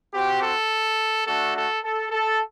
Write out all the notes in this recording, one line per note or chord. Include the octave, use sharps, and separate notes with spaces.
C4 F#4 G4
A4
A3 D4 F#4 A4
A4
A4
A4